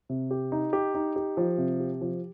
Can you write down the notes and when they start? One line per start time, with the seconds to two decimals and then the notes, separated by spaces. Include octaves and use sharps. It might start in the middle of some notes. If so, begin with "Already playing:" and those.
0.09 C3
0.31 G4
0.52 D#4
0.73 G4
0.94 D#4
1.16 G4
1.37 F3
1.58 C3
1.80 G4
2.01 F3